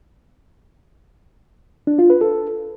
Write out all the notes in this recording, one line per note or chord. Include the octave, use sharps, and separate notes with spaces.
D4
F4
B4
A4